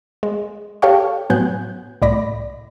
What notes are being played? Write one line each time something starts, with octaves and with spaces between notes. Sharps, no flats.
G#3
G4 A4 C#5 F5 G5 C#6
A2 F#3 B3 G#5 F#6 G6
C2 A2 D5 B5 A#6